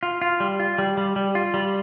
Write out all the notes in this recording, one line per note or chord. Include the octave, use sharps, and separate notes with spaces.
F4
F4
G3
F4
G3
G3
G3
F4
G3